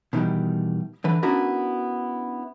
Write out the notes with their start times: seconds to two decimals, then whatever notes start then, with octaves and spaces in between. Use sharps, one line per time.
0.13 B2 D#3 E3 G3
1.04 D3 E3 B4
1.23 B3 C#4 D4 E4 F#4 A#4